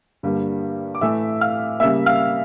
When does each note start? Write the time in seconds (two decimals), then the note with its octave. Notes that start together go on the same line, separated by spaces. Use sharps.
0.23 G2 D3 G3 A#3
0.95 D6
1.01 A2 E3 A3 E5 E6
1.41 F5 F6
1.80 C#3 G3 A#3 E5 E6
2.06 F5 F6